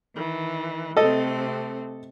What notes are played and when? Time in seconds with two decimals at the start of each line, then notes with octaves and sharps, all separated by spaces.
0.14 D#3 E3
0.97 C3 A3 C4 A4 D#5